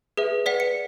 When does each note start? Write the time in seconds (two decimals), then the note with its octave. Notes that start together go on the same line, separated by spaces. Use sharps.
0.17 G#4 B4 E5
0.46 B4 D5 F#5 B6
0.60 C#7